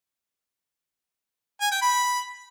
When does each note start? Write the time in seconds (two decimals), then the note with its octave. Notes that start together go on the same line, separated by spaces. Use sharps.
1.61 G#5
1.71 G5
1.82 B5